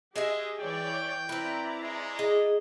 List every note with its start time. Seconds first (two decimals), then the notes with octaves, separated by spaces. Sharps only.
0.16 G#3 G4 G#4 D#5 E5
0.60 E3 C#5 D5 G5
1.29 C4 E4 B4 D5 A#5
1.81 G#3
2.19 G#4 D#5